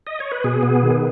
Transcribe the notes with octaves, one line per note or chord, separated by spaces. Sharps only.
D#5
C#5
B4
B2 G#4
B3
D#3